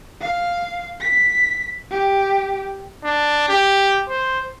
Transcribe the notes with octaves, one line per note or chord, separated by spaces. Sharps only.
F5
B6
G4
D4
G4
C5